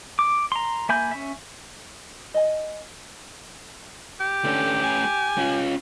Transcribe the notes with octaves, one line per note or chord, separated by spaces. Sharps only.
D6
A#5 C6
A#3 E5 G#5 B5 G6
C#4 E5
D#5 G#5
G4
D3 A3 C#4
G#5
C#4 F4